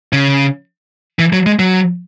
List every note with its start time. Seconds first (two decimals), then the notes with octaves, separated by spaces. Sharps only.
0.13 C#3
1.19 E3
1.33 F#3
1.46 G#3
1.59 F#3